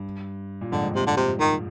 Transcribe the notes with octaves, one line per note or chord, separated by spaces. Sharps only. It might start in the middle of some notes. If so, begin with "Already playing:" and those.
Already playing: G2
A#2
F2 G#2 D3
C3
D3
C3
D#3